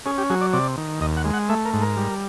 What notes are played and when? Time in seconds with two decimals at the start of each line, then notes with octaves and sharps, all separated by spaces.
0.06 C#4 G#4
0.18 G4
0.30 F#3 G#4
0.41 D5
0.53 C3 D5
0.77 D#3
1.01 D#2 D#5
1.17 F#5
1.25 G#3
1.34 F#5
1.49 A3 E5
1.65 A#4
1.73 G#2
1.81 A#4
1.96 G3